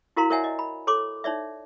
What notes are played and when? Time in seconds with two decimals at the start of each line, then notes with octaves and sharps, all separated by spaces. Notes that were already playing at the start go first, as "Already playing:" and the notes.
0.17 E4 F#4 A#4 F5 A#5 C6
0.30 A#4 C#5 D5 E5 F#5 G#5
0.44 D#5
0.59 B5
0.87 A4 C#5 C6 D6
1.24 D#4 C#5 D5 E5